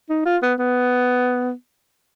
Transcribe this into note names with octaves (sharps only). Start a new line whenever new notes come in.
D#4
F4
B3
B3